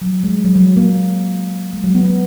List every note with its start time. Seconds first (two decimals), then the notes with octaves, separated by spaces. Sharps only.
0.02 F#3
0.24 G#3
0.44 F#3
0.56 F#3
0.77 A#3
1.73 G#3
1.84 F#3
1.95 B3
2.05 B3